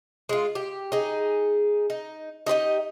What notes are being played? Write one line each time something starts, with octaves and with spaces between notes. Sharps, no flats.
G#3 F4
G4
D#4 G#4
D#4
D#4 G4 B4 D#5